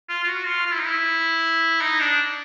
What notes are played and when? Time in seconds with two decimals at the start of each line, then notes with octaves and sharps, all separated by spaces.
0.09 F4
0.23 F4
0.27 F#4
0.46 F4
0.66 F4
0.73 E4
0.80 D#4
0.87 E4
1.81 D#4
2.00 D4